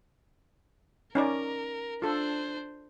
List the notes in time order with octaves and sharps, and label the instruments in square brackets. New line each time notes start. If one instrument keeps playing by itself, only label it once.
[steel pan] C#4 D#4 D5 [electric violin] A#4
[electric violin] D4 C5 [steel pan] F4 A4